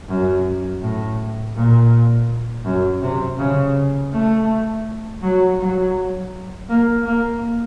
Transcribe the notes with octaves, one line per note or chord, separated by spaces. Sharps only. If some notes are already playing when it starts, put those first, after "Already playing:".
F#2
A2
A#2
F#2
C3
C#3
A3
F#3
F#3
A#3
A#3